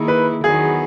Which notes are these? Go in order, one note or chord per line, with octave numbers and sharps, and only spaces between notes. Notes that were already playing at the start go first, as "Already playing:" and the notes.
Already playing: D#3 A#3 E4 G#4
B4
E2 D#3 F#3 B3 G#4